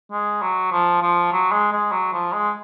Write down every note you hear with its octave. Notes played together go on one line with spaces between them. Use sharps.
G#3
F#3
F3
F3
F#3
G#3
G#3
F#3
F3
G#3